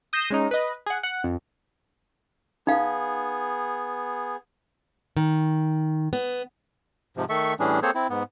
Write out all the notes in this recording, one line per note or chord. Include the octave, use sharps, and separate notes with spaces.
D#6 G6 A#6 C7 E7
G#3 C#4 D#4
B4 D#5
G#4 F#5
F#5
F2
B3 D#4 G#4 F5
D#3
B3
G#2 C3 F3
D#3 A3 A4 E5 C#6
A2 E3 G3 C#4 D4 G#4
A#3 C4 G#4 A4 C5 C#5
C4 E4
G#2 B3